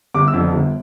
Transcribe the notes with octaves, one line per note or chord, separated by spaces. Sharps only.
G1 D6
E6
F2 D3 F3
G1